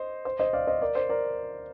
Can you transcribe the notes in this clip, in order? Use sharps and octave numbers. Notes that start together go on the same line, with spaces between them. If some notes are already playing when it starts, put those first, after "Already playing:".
Already playing: C5 D#5
C5
C5 D#5
D5 F5
C5 D#5
A#4 D5
C5
A#4 D5